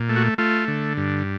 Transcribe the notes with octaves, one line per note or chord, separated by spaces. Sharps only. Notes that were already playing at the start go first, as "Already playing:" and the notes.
Already playing: A#2
A3
F#4
A3 F4
D3
G2